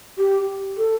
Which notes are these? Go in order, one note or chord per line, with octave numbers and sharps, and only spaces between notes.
G4
A4